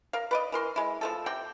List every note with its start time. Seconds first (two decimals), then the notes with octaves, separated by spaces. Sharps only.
0.13 A#4 F5
0.31 B4 D5 D#5
0.52 E3 A#4 C6
0.76 G#3 E4
1.01 F3 A3 A4
1.26 C3 C4 D5 G5